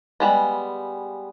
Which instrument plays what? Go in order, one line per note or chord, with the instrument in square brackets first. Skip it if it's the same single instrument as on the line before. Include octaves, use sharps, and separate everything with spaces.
[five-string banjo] G3 G#3 B3